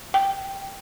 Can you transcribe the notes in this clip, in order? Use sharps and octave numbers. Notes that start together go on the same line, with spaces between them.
G5